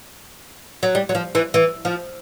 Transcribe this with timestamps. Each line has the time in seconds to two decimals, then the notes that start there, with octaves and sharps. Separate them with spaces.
0.83 F#3
0.95 G3
1.09 F#3
1.15 F3
1.35 E3
1.54 E3
1.85 F3